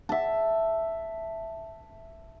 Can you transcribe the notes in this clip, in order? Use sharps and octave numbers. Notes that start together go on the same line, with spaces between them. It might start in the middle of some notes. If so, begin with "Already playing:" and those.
E5 A5